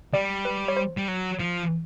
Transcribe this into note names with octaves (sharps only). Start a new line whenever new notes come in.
G3 D5
B4
C#5
C5
G3
F#3
F3